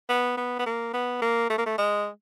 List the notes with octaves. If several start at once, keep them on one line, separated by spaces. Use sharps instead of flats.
B3
B3
B3
A#3
B3
A#3
A3
A#3
A3
G#3